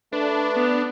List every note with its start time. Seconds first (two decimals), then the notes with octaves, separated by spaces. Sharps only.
0.12 A3 D4 B4
0.55 B3